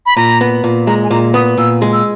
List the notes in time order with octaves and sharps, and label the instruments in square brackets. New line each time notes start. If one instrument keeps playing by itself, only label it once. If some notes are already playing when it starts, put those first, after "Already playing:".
[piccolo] B5
[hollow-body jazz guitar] A#2 [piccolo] A#5
[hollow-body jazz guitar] B3
A#2
[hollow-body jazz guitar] G#3 [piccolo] A#5
[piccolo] G#5
[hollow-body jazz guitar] A#2 [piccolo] A#5
[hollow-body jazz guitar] B3 [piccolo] D#6
[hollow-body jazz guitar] A#2 [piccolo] E6
[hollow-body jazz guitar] G#3
[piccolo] E6